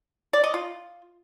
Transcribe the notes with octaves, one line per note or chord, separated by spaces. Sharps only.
D5
D#5
F4